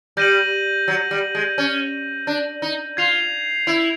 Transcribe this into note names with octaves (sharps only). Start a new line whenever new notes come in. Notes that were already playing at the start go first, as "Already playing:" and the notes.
G3 G6 A#6 D#7 F#7
F#3
G3
G#3
C#4
D4
D#4
F4 G#6 C7 F7
E4